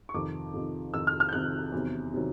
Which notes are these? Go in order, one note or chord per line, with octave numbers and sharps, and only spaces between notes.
C#6
F2 C3 D#3 D6
F2 C3 D#3
F2 C3 D#3 E6
F6
F6
G6
F2 C3 D#3 F#6
E2 C3 D#3 F#3
C3 D#3 F#3